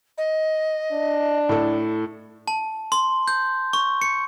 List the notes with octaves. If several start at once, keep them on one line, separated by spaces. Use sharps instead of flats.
D#5
D4
A2 A4
A5
C6
G6
C#6
C#7